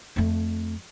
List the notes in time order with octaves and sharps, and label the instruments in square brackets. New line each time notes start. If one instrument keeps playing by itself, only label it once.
[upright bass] F2 A3